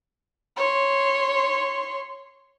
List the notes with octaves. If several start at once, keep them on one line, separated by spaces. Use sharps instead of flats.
C#5 C6